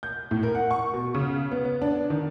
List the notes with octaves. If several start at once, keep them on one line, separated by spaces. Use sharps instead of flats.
G6
A2
A#4
F#5
C#6
B2
C#3
B3
B3
D4
D#3